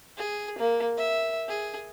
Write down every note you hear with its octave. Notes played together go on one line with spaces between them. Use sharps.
G#4
A#3
E5
G#4